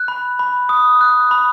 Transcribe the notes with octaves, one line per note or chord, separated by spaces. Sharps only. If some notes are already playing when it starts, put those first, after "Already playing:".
Already playing: F#6
B5
B5
D#6
F#6
B5